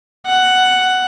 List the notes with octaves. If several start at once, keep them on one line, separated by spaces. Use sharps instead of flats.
F#5